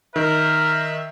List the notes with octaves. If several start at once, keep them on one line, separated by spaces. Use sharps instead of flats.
D#3 A#4 E5